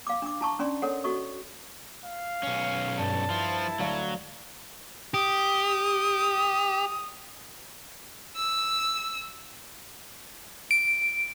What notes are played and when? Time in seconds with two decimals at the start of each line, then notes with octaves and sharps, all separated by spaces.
0.07 F5 D6
0.22 D4 D6
0.41 E4 A5 C#6
0.59 C#4 D4 D5 C6
0.82 A4 A#4 C#5 F#5
1.04 F#4 A4 D#5 C#6
2.04 F5
2.43 B1 C#4
2.98 G2 A5
3.30 F3 E4 F4
3.79 D2 F#3 F5
5.14 G4 D#6
8.35 E6
10.71 D7